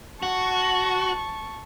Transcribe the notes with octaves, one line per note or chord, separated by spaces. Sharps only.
F#4 A5 C#6